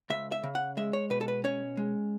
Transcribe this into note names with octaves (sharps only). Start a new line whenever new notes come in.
C#2 E5
E5
C#3
F#5
G#3 E5
C#5
B2 B4
A4
B4
C#4 C#5
G#3